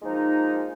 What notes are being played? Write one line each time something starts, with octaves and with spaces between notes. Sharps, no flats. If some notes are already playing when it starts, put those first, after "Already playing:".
A#2 F3 G#3 D#4